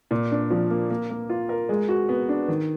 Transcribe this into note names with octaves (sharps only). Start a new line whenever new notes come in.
A#2
D4
F3
A#3
A#3
A#3
F4
A#4
G#3
F#4
B3
D4
D#3